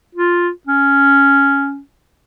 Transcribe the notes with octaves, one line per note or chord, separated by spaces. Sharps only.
F4
C#4